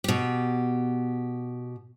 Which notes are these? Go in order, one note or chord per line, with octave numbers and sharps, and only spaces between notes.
B2 G4